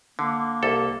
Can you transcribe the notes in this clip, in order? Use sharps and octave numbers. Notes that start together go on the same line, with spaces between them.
D3 A#3
C2 A4